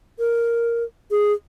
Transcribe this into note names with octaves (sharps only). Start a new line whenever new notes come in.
A#4
G#4